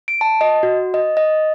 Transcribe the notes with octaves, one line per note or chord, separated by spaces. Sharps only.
D7
A5
D#5
F#4
D#5
D#5